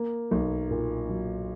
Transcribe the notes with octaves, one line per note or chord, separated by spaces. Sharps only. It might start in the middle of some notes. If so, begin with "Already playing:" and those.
Already playing: A#3
B1
A#2
F#3